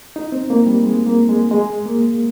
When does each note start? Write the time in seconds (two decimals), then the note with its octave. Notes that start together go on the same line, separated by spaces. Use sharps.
0.16 D#4
0.32 C4
0.50 A#3
0.66 G3
0.84 G#3
1.06 A#3
1.29 G#3
1.51 G#3
1.85 A#3